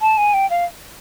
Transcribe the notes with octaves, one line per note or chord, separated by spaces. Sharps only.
A5
G#5
G5
F5